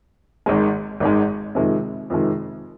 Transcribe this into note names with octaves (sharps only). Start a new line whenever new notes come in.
G#1 G#2 D#3 G#3
G#1 G#2 D#3 G#3
F2 C3 D#3 G#3
F2 C3 D#3 G#3